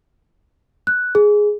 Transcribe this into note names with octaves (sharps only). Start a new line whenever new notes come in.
F#6
G#4